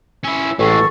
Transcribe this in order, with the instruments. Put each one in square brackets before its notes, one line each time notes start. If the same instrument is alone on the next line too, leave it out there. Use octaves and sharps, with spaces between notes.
[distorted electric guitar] C#4 E4 [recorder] E6
[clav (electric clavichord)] A1 [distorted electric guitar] E3 G#3 [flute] A4 [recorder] C#6